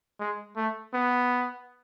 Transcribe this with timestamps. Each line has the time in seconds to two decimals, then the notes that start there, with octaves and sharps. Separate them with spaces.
0.20 G#3
0.56 A3
0.94 B3